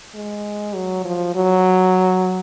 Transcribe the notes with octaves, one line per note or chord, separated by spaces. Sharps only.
G#3
F#3
F3
F#3